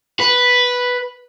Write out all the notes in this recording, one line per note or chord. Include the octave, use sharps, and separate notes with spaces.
B4